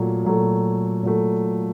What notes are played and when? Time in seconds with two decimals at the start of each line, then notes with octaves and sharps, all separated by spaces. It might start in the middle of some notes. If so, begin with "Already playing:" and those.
Already playing: A#2 F#3 A3
0.25 A#2 F#3 A3
1.03 A#2 F#3 A3